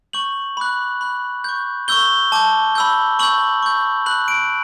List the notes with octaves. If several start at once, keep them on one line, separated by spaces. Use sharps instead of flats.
C#6 G6 F#7
B5 D6 F#6
B5 F#6
C#6 G6
C#6 E6 G6 G7
A5 D6 G6
B5 E6 G6
C#6 E6 G6 F#7
C#6 G6
B5 F#6 F#7
D7